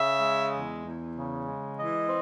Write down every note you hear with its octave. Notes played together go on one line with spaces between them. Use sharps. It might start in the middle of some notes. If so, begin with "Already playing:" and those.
Already playing: C#3 E5
G#3
E2
E2
C#3
G#3
E3 D#5
C4